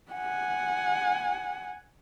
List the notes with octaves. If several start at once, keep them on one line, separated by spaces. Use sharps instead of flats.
F#5 G#5